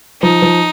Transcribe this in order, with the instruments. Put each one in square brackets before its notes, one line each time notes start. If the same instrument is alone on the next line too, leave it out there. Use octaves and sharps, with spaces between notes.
[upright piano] F3 [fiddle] D#4
[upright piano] F3